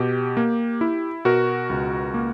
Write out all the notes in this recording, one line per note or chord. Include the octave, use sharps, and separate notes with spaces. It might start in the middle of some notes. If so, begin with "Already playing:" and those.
Already playing: B2 G4
A#3
E4
B2 F#4 A#4
C#2
A#3